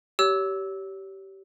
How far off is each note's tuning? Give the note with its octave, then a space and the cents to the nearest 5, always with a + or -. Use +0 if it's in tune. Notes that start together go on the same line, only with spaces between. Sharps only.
G4 -20 C#5 +25 E6 -15